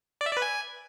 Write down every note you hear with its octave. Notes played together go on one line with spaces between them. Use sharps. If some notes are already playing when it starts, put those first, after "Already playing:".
D5
E5
D5
B4
G#5